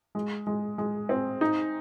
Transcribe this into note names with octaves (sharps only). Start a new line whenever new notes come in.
G#3
G#3
G#3
C4
D#4